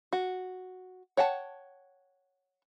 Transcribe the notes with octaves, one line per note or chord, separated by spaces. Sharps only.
F#4
C#5 F#5 G5 A5